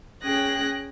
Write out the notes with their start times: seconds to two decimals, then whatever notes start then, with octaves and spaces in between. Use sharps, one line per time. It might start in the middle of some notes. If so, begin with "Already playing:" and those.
0.22 C#4 G#4 G5 F#6 A#6